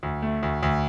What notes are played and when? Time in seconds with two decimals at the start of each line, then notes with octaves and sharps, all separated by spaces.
0.03 D2
0.22 A3
0.43 D2
0.63 D2